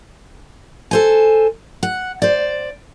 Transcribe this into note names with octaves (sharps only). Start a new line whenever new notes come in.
A4 C5 G#5
F#5
C5 D5